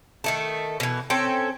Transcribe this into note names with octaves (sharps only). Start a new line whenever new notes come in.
D#3 A3 A4
B2 E3
C4 C#4 A4 G5